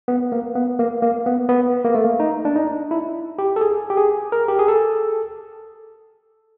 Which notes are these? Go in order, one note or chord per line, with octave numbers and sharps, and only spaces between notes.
B3
A#3
B3
A#3
A#3
B3
B3
A#3
A3
A#3
D#4
D4
D#4
E4
G4
A4
G#4
G4
G#4
A#4
G4
G#4
A4